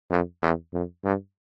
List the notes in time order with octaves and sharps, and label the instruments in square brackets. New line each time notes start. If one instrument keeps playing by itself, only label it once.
[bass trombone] F2
E2
F2
G2